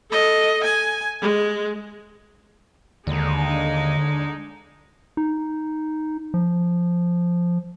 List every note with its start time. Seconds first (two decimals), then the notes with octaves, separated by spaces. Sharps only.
0.10 A4 D#5
0.64 G#5
1.21 G#3
3.07 D#2 D3 G#3 D#4
5.17 D#4
6.34 F3